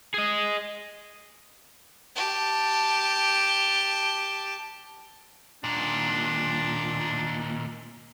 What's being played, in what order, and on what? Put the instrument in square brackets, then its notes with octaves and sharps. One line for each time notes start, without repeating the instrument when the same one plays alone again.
[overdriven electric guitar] G#4 D#5
[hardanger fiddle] G4 A5
[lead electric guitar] D#2 A#2 [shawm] D4